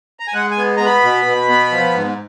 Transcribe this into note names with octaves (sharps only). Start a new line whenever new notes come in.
A#5
G#5
G#3 F#5
G#5
B3
B3 A#5
B5
B2
B2
B3
F3
G#2